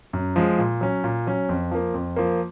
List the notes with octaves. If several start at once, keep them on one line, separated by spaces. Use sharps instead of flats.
F#2
F3 G#3
A#2
F#3 C#4
A#2
F#3 C#4
F2
F3 A#3
F2
F3 A#3